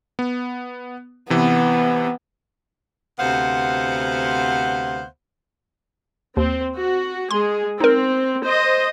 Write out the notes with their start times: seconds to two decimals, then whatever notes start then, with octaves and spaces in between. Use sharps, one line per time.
0.19 B3
1.30 C3 E3 B3
3.19 D2 C3 B3 C5 F5 F#5
6.37 D#2 C4
6.78 F#4
7.31 G#3 G#4 C6
7.80 C4 D#4 A#4
8.46 C5 D#5